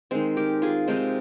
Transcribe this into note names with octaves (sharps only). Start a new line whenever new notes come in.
D#3 G#3 C4
G4 A#4
F4 G#4
C3 F3 G#3 C4 D#4